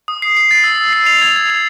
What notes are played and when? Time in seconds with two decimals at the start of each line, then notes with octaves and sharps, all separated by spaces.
0.08 D#6
0.22 C7
0.37 C7
0.51 A6
0.64 E6
0.78 E6
0.93 C7
1.06 F7
1.22 G#6
1.36 G#6
1.50 F7